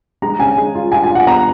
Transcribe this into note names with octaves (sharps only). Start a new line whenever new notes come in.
G#3 A#5
C#3 G#5
G#3
F4
F4 G#5
G#5
F4
F#5
B3 A#5